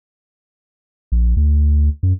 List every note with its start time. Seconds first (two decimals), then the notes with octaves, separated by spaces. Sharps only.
1.12 A#1
1.37 D2
2.03 F#2